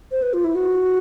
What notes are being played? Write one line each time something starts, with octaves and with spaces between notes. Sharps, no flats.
C5
B4
F4
E4
F#4